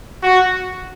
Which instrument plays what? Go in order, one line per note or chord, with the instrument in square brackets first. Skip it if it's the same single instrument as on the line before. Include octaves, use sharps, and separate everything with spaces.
[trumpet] F#4